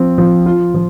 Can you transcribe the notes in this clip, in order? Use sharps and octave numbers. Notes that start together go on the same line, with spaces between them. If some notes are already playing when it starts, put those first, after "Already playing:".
Already playing: F3 C4
F3
F4
F3